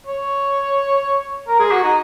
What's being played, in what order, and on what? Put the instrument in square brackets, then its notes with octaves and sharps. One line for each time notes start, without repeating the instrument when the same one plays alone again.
[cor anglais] C#5
A#4
G#4
F#4
D#4